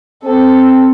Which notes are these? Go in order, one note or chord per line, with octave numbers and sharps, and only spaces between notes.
C4 A4